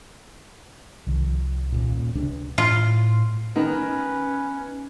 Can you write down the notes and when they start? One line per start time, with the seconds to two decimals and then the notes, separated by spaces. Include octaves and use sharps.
1.07 C2 D#3 F3
1.72 D#1 A#2
2.15 C#2 C3 D4
2.58 A2 F4
3.56 D#3 B3 C#4 D#4 B4